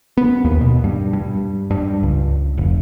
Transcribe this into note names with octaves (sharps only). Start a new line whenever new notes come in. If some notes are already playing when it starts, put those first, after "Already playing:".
B3
D#2
B2
G2
G2
G2
C#2
F1